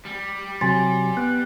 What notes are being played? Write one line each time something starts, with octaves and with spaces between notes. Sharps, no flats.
G3
C3 F#3 G#5 C6 A6
B3 F#6